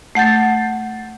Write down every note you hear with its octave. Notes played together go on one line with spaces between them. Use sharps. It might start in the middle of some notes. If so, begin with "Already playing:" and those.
A3 F#5 G6 A6